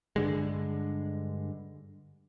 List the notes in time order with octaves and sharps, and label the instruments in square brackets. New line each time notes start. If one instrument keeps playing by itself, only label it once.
[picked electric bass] G2 D3 G#3